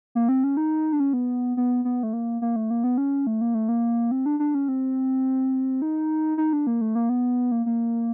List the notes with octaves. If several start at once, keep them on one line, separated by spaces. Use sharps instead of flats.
A#3
C4
C#4
D#4
D4
C#4
B3
B3
B3
A3
A#3
A#3
A3
A#3
B3
C#4
A3
A#3
A3
A#3
C4
D4
D4
C#4
C4
D#4
D#4
D4
A#3
A3
A#3
B3
A#3
A#3